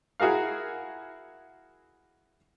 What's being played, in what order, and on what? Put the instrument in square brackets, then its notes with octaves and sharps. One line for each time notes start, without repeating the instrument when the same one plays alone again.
[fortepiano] E4 F#4 G#4 A#4 F5